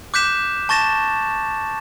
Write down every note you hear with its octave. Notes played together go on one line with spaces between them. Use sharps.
D6 F#6 G6 B6 E7
A5 C#6 A6 A#6 E7